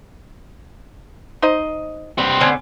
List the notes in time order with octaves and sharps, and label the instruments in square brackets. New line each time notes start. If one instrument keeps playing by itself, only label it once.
[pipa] D#4 C5 D#5
[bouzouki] G3 [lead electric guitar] C4 B4
[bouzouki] D3 B3 C5 [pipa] C#4